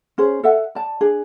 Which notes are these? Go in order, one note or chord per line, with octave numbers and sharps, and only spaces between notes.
C#4 G#4 C5
A4 E5 F#5
D5 A5
D4 G#4